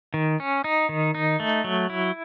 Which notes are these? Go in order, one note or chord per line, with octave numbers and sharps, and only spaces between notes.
D#3
C#4
D#4
D#3
D#4
A3
F#3
E4